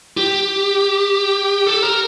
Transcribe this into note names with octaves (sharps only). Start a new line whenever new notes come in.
G4
A4
A#4